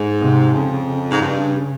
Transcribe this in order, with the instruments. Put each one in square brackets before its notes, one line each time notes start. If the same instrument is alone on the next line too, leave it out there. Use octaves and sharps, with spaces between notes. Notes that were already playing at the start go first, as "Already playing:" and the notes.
Already playing: [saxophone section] G#2
[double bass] C3
[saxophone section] F2 [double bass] C#3
[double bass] C#3
[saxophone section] G#2
G2